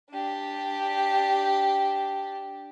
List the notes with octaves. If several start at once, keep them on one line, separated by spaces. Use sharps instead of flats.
D4 G4